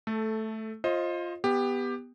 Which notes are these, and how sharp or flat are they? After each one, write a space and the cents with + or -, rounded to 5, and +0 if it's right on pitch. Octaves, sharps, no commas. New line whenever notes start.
A3 +0 A4 -10
F4 +0 C5 +30 D#5 +10
B3 +0 G4 +15